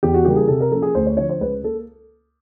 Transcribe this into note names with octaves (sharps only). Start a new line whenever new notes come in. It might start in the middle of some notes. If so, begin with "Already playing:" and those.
E2 G4
F#4
C#3 E3 G3 A#3 G4
G#4
C3 A4
A#4
F3 A#3 C#4 A4
G#4
D2 C5
C#5
D3 F3 C#5
C5
C#2 B4
A#3 A4